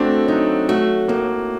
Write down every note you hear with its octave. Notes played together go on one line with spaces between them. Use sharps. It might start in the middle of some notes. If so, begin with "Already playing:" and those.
Already playing: A3 C4 D4 F#4
F#3 D#4
A3 F#4
A2 A#3